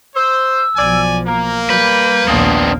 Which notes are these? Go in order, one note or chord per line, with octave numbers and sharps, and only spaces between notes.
C5 E6
B1 F3 D5 G#5
A#3 A#5
G3 B4 G6
A#1 D#2 B3 C4 D4 D#6